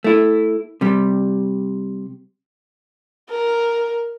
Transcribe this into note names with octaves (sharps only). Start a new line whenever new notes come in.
A3 E4
C3 G3
A#4